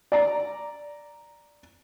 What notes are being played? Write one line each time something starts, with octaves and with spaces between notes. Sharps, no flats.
D5 A#5